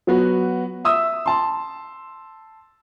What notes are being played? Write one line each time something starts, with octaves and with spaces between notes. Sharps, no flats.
F#3 B3 F#4
E5 D#6 E6
A5 C6